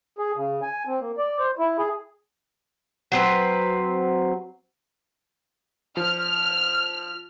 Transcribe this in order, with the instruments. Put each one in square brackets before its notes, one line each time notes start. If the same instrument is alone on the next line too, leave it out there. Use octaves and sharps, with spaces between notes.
[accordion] G#4
C#3
G#5
C4
A#3
D5
C5
E4
G#4
[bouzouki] F#3 C4 B4
[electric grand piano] F3 [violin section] F6